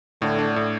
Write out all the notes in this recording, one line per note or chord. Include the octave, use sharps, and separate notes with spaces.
A2 D3
D4
A2